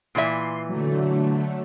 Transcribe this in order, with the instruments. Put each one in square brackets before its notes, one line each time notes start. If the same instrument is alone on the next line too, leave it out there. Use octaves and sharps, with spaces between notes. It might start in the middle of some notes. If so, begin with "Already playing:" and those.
[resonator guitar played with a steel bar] A#2 E3 E5 [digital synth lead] C6
[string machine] D3 A3 [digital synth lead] F#3